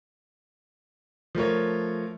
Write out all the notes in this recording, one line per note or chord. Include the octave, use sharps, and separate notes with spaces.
F3 A3 A#4 C#5